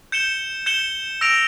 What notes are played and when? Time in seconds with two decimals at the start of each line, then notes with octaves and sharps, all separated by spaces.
0.12 G6 C#7 E7 G7
0.66 G6 C#7 E7 G7
1.21 E6 A#6 D7 F7